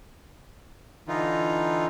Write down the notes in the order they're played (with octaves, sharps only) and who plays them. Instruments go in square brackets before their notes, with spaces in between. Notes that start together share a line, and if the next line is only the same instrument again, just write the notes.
[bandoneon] D3 E3 D#4 F4